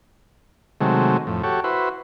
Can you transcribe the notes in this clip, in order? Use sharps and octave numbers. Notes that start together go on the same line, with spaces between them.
C3 D#3 F#3 G#3 A3
F2 A2
F#4 G4 A4 C#5
E4 F#4 B4 C5